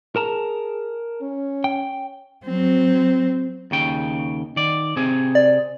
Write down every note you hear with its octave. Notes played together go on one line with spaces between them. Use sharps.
G#4 A#4 A5 A#5
C#4
G5
F#3 C4
D#2 C#3 G5
D#3 D5
C3 C4 G#4
D5